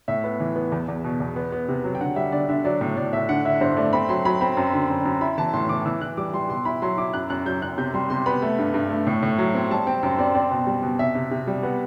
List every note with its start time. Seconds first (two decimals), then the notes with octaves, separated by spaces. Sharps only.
0.08 A2 E5
0.24 B3
0.40 E3
0.56 B3
0.72 E2
0.88 E2
1.04 B2
1.20 E2
1.36 B3
1.52 B3
1.69 C3
1.84 F#3
1.95 G5
2.00 D3 F#5
2.16 G3 E5
2.32 D3 D5
2.49 D3 E5
2.65 F#3 D5
2.81 A2
2.97 A2 D5
3.13 A2 E5
3.29 D3 F#5
3.45 E4 E5
3.61 G2 C5
3.77 A3 D5
3.93 C4 B5
4.09 F#3 C6
4.25 F#3 B5
4.41 C4 B5
4.57 F#2
4.73 D3
4.90 F#2
5.05 F#2
5.21 E4 B5
5.38 E3 A5
5.53 A2 C6
5.69 E3 D6
5.86 E3 E6
6.01 E3 F#6
6.17 G3 D6
6.34 G3 C6
6.50 B2 C6
6.65 E4 B5
6.82 F#3 C6
6.98 E4 D6
7.13 F#2 F#6
7.30 F#2 F#6
7.46 F#3 G6
7.62 F#2 F#6
7.78 C3 G6
7.94 G3 C6
8.10 C3 C6
8.26 B3 B5
8.42 A3
8.58 G2
8.74 G2
8.90 A3
9.07 A2
9.23 A2
9.38 F#3
9.54 C4
9.71 G3 A5
9.87 C4 G5
10.03 F#2 G5
10.19 C4 D5
10.35 C4 D5
10.51 B2
10.67 G3
10.83 B2
10.99 C3 E5
11.15 C3
11.31 C3
11.47 G3
11.63 B3 F#5